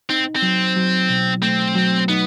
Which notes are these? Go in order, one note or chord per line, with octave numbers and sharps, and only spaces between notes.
C4 D#4
C4
F#3
F#3
B2
A3 C4
F#3
B3 D#4